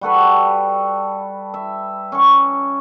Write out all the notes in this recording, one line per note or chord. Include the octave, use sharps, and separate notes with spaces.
G3 F#4 A4 B4
E5
C#4 C#6